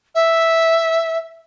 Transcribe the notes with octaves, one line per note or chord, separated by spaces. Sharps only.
E5